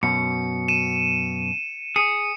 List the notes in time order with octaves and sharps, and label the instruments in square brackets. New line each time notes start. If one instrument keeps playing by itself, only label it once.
[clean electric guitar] F#2 B2 [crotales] C#7
[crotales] D#7 E7
[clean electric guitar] G#4 [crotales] C#7